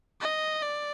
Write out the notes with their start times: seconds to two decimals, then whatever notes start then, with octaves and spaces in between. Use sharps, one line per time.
0.21 D#5
0.63 D5